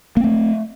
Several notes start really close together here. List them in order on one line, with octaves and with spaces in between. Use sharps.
A#3 C4 A3